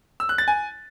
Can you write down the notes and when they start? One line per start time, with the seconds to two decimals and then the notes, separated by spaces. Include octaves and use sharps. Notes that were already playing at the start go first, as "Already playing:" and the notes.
0.20 E6
0.29 F#6
0.38 A6
0.48 G#5